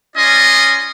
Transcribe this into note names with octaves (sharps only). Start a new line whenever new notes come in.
C#4 F4 D5 D#5 G#5 C6